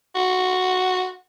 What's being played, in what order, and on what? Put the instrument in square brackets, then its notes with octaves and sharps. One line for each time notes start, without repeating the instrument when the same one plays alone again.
[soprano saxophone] F#4